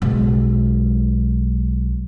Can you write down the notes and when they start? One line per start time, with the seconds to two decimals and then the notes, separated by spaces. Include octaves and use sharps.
0.02 B1 G#3